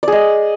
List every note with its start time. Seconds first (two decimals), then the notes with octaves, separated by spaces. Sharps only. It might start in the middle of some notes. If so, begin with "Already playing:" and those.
0.03 D5
0.08 G#4
0.12 D#5